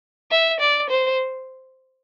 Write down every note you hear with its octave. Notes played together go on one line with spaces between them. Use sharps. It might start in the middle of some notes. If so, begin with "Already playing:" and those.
E5
D5
C5